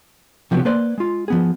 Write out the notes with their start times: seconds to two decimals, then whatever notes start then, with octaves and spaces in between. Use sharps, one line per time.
0.51 C3 F3 F#3 B3 E4 G4
0.65 A#3 B4 C5 D5
0.98 G#3 F4
1.28 F3 B3 G#4